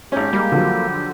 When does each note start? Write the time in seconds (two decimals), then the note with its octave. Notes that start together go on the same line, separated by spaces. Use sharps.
0.12 G#1 C#4 G4
0.33 G3 G#3 A#3
0.52 D3 F3 F#3